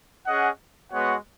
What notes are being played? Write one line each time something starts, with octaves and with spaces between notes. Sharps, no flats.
C#4 G#4 D#5 F#5
G#3 B3 F#4 C#5 F#5